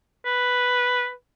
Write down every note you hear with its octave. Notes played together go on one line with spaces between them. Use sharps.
B4